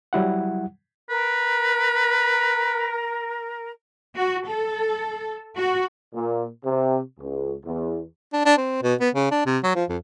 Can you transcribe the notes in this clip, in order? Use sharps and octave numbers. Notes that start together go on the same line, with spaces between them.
F#3 G3 E4 F#5
A#4 B4
F#4
A4
F#4
A#2
C3
C#2
E2
D4
D4
C4
B2
B3
C#3
D4
C3
F#3
F3
F2